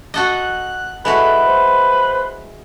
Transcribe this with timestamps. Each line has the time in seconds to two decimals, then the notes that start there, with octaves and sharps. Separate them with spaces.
0.14 F#4 A4 D#5 F#6
1.05 G#3 E4 F#4 A4 B4
1.46 C5